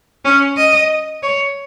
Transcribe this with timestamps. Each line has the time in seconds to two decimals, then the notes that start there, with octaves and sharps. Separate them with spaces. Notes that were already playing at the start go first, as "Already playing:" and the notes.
0.25 C#4
0.57 D#5
1.23 C#5